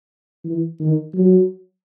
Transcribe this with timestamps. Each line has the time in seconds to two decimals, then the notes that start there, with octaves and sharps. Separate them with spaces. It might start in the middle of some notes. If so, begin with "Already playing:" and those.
0.45 E3
0.80 D#3
1.15 F#3